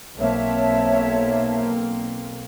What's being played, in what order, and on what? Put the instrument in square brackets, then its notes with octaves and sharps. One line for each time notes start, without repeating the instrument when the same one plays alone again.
[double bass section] B1 A#3 C4 [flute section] C#5 E5 A5